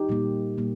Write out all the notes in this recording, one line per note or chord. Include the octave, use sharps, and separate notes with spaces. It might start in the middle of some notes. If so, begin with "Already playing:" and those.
Already playing: D#4 G4
A#2 G3 A#3
A#2 G3 A#3